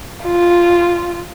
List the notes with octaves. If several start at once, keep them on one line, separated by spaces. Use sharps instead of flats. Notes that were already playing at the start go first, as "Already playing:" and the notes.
F4